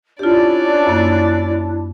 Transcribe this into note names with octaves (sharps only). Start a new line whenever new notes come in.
C#4 D4 E4 F4 G4 D5
F#2 A#3